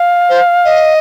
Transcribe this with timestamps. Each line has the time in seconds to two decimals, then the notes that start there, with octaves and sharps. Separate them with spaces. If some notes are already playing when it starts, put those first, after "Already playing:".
Already playing: F5
0.29 C5
0.65 D#5